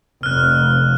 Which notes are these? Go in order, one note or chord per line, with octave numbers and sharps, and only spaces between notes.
F1 F6 F#6